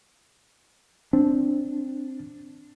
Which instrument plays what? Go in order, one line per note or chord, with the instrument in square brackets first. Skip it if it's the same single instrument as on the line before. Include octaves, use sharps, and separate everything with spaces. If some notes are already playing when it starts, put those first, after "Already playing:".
[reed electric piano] C4 [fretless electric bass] D4